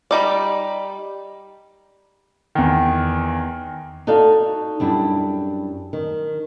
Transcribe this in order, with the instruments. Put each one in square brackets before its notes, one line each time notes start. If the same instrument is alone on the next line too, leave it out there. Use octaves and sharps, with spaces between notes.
[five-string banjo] G3 D#4 D5
[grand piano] E2 D#3
[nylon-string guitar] D#4 F#4 A4 D5 F5
F#2 G3 D4 E4
D#3